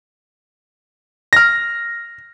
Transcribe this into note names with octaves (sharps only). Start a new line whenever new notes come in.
F6 A#6